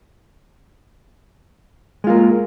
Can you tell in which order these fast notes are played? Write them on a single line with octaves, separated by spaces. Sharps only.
G#3 F4 A#3